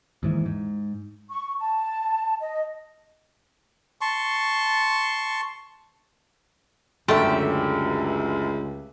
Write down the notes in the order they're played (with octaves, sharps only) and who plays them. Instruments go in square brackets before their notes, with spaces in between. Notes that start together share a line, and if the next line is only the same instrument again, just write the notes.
[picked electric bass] D#2 G#2 E3
G#2
[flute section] C#6
A5
D#5
[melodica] A5 C6 C#6
[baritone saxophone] C#2 [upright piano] F#2 D3 [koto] A3 [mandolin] G4 E5